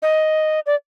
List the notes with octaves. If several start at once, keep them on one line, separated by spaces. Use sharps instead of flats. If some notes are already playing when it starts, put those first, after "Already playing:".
D#5
D5